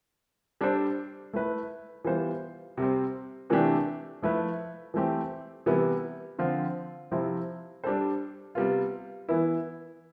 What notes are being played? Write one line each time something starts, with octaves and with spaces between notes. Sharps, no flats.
G3 D4 A4 C5
A3 E4 B4
E3 G3 B3 F4 C5
C3 G3 C4
C3 E3 A3 D4 G4
F3 A3 E4 B4
E3 A3 C4 G4
C3 E3 G3 B3 E4
D3 F3 C4 F4
C3 F3 C4 E4
G3 D4 A4 C5
C3 G3 B3 F4
E3 B3 E4